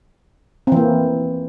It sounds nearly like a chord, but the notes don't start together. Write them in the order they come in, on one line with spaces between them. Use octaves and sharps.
C4 E3 A#3